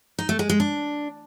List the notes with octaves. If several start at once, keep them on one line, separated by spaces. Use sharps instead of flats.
D#4
A3
G#3
G#3
D4